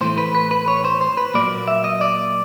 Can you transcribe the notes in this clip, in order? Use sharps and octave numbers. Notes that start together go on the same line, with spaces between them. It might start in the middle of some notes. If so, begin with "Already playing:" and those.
A2 E3 A3 C5
B4
B4
B4
C#5
C5
C5
B4
A#2 F#3 A#3 D5
E5
D#5
D5